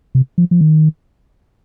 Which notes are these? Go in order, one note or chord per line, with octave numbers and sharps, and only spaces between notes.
C3
F3
F3
D#3